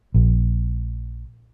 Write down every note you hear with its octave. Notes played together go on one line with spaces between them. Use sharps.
A#1